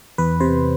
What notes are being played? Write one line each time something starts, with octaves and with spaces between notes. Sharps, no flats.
E2 B4
C3 C5